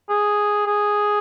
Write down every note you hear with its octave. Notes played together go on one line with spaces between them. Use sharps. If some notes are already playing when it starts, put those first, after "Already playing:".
G#4
G#4